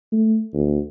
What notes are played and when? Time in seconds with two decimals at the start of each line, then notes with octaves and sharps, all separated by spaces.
0.12 A3
0.54 D2